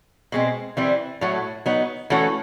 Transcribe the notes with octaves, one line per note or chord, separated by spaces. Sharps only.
B2 G#3 C4
E3 G3 C4
A2 F#3 A3
F#3 B3 D#4
E3 A3 C#4 F#4 A4